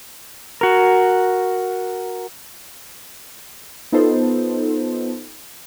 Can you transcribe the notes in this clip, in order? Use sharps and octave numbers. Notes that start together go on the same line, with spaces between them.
F#4 A#4
B3 D#4 F4 A4 C5